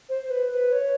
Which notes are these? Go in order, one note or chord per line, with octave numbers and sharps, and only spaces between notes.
C5
B4
B4
C#5